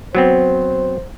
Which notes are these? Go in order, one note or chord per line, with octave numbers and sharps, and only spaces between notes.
F#3 B3 C4 C5